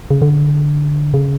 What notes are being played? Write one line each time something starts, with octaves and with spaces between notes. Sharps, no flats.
C#3
D3
C#3